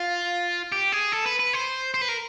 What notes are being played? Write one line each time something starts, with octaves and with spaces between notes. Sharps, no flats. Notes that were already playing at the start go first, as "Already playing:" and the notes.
Already playing: F4
G4
G#4
A4
B4
B4
C5
C5
B4
A#4